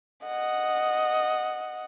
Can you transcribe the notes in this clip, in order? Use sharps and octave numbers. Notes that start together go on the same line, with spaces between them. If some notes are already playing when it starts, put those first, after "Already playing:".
D#5 F#5